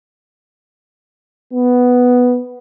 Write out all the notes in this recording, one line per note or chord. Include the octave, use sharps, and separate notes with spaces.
B3